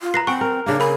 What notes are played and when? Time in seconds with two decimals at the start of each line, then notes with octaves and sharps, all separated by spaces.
0.01 F4
0.14 B4 A#5 A#6 C7
0.27 C4 F#5 G#5 C#6
0.41 A#4
0.66 C#3 A#3 D4
0.80 A#4 G#5 B5